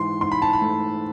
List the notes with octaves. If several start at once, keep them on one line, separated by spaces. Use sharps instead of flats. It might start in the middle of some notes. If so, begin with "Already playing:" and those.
Already playing: G#2 E3 C6
G#2 C6
B5
A5
B5
A3